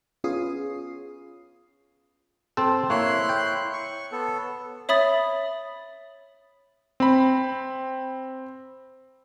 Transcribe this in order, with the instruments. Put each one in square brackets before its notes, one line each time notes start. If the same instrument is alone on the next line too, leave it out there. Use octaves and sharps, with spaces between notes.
[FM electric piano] B3 C#4 F4 G#4 D#6 C7
[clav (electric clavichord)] C4 A4 [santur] C5
[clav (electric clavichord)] A#3 [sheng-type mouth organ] E4 C6 F#6 [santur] C#5
[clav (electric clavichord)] G5
[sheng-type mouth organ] C#6
B3 A4
[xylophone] C#5 E5 B5 D#6 A6
[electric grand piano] C4 B5